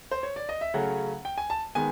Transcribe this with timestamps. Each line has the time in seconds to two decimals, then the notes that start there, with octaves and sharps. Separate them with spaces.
0.11 C5
0.23 C#5
0.36 D5
0.49 D#5
0.61 E5
0.74 C#3 F#3 A3 C#4 F#5
1.25 G5
1.38 G#5
1.50 A5
1.75 D#3 G#3 B3 G#5